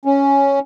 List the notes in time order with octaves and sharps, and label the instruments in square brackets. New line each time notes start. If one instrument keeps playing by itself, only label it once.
[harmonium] C#4